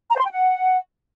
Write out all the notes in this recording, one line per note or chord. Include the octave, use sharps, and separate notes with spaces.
A#5
C5
C6
G5
F#5